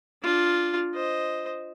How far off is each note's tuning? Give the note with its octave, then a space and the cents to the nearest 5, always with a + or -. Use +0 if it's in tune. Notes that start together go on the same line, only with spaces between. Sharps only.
D4 +0 F4 +0
C5 +0 D#5 +0